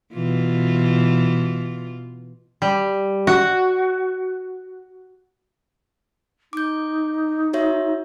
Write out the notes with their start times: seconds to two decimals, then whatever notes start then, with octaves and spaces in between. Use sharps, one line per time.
0.13 B2 E3 F4
2.62 G3
3.27 F#4
6.53 D#4 D6 G6
7.53 F#4 C#5 E5